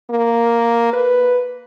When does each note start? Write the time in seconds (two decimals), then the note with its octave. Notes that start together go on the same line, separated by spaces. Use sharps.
0.10 A#3
0.93 B4